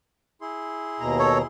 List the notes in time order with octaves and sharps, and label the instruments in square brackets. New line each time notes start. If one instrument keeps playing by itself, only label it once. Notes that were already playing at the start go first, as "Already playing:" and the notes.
[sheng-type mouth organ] E4 G#4 C6
[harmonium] D#2 B2 A#5
[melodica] A4 C#5